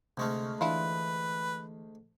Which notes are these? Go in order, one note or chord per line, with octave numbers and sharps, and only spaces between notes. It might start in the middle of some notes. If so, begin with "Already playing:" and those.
D2 C3 G#3 A3 C#6 F6
E3 D4 E4 F4 B4